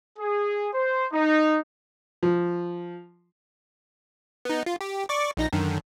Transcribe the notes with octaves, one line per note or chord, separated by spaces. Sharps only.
G#4
C5
D#4
F3
B3 D#4
F4
G4
D5 C#6 D6
A#1 D#4 A#6
F#2 D3 D#3